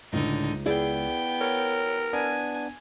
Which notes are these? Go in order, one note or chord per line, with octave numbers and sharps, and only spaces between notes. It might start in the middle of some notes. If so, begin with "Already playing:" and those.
C#2 A2 D3 D#4
B3 E4 G#4 D5 G5
A#4 C#5
B3 D4 G#5